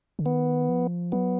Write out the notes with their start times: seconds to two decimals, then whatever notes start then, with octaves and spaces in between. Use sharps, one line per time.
0.19 D3
0.26 D#3 B3
0.69 F3
1.12 F#3 B3